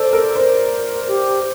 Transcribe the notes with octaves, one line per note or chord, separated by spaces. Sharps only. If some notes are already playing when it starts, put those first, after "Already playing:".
Already playing: A4 C5 D5
A#4
A#4 C5
G4